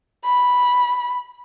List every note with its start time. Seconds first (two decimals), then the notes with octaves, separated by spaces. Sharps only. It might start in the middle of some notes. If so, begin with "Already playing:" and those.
0.24 B5